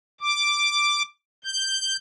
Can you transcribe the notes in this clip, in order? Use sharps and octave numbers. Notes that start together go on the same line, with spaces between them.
D6
G6